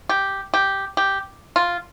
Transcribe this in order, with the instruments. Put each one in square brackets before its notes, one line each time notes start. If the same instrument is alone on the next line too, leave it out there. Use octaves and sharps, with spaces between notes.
[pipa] G4
G4
G4
F4